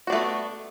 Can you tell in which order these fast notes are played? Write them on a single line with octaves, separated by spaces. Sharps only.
F#4 D4 A3 B3